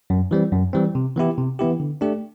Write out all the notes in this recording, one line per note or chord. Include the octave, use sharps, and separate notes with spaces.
F#2
E3 G3 C4
F#2
E3 G3 C4
C3
E3 B3 E4 G4
C3
E3 B3 E4 G4
D3
A3 D4 G4